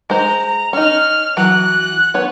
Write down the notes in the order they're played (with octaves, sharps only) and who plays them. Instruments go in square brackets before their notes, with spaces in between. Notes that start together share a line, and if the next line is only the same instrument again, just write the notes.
[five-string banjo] G#3 C5 [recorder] A#5
[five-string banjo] C#4 D#4 [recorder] F6
[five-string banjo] E3 F#3 [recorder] F#6
[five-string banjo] B3 C#5